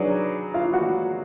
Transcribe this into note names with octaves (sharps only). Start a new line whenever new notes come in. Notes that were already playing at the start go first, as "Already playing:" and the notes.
Already playing: F#3 D4 D#4 G#4 B4 D5
F4 F5
F#4 F#5